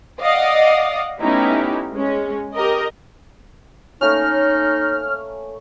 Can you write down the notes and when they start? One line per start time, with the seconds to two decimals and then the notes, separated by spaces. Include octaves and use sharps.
0.21 D5 D#5 F5 F#5 D#6
1.20 A3 B3 C#4 D#4 E4 G4
1.94 G#3 C#4
2.55 G4 A#4 D#5
4.01 A3 A#3 C#4 D#4 C#5 F6